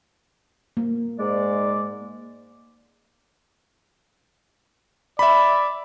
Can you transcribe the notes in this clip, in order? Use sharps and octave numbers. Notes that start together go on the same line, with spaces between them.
A#3
G#2 G#3 D5
D5 E5 B5